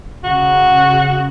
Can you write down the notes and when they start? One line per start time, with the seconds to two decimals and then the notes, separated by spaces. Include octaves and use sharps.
0.24 C#3 F#4